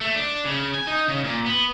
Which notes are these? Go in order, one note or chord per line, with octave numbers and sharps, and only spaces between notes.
A3
D4
C#3
G#5
D#4
C#3
A#2
B3